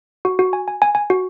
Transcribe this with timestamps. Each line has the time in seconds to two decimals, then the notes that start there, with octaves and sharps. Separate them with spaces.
0.25 F#4
0.39 F#4
0.53 G#5
0.68 G#5
0.82 G#5
0.95 G#5
1.10 F#4